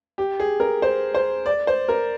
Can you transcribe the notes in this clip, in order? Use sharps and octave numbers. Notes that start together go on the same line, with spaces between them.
G4
G#4
A#4
C5
C5
D5
C5
A#4